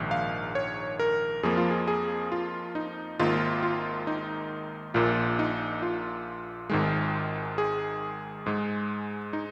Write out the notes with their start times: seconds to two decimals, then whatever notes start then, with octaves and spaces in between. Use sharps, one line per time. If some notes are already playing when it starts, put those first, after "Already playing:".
Already playing: A#1 G#2 D#3
0.11 F5
0.55 C#5
0.99 A#4
1.43 F2 F3 A#3 G#4
1.57 F4
1.70 G#4
1.88 G#4
2.32 F4
2.75 D#4
3.19 G#1 G#2 D#3 A#3 F4
3.63 F4
4.07 D#4
4.94 A#1 A#2 A#3 F4
5.39 D#4
5.82 F4
6.70 G#1 G#2 D#3 G#3
7.58 G#4
8.46 G#2 G#3
9.33 D#4